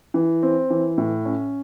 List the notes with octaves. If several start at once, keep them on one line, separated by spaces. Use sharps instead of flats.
E3
C4
E3
A2
C#4